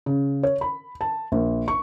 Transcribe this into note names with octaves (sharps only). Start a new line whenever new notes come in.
C#3
C#5
B5
A5
A#1
C#6